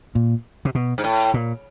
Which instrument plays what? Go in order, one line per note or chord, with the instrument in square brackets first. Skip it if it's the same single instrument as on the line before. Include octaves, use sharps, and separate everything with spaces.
[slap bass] A#2
C3
B2
[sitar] G#2
A2
[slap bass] A#2